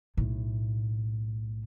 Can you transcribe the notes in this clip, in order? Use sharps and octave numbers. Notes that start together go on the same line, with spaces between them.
B1 A2